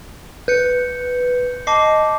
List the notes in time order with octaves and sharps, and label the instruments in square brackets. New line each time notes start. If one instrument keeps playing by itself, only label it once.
[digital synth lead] B4 [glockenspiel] G6 C#7
[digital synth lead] D#5 [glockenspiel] A5 D6 C7